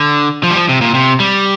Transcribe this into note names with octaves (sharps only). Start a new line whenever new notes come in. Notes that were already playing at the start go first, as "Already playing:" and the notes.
Already playing: D3
F3
G3
F3
C3
A#2
C3
G3